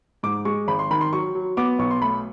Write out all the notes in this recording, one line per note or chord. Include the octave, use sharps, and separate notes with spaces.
G#2 D6
G#3 C#6
G#1 B5
C6
D#3 B5
C6
F#3 C#6
F#3
B3 D6
B1 C#6
C6
A3 B5